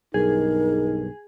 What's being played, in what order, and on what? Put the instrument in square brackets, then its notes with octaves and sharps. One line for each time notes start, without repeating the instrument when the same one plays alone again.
[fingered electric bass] B1 G2 [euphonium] D#4 [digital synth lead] G#4 [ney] A#4